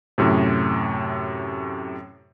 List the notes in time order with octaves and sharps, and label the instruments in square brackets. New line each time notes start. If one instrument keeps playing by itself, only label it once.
[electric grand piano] F#2 A2 C3